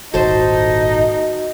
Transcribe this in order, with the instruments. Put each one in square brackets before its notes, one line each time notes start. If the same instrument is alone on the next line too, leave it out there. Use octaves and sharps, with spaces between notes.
[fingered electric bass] D#1 G#1 A#2 [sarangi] D#4 [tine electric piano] F#4 [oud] A4 C5